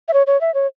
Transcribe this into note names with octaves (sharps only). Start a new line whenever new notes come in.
E5
C#5
C#5
E5
C#5